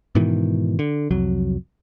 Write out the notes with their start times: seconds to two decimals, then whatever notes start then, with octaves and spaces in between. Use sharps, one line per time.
0.15 G#2 B2 D#3 E3
0.79 D3
1.11 C2 F2 F#3